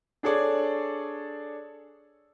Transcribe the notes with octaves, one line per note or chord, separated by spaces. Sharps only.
D4 G#4 A4 C#5 D5